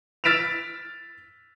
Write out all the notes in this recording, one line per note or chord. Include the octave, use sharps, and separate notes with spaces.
F6 A6 B6 D7 E7 F7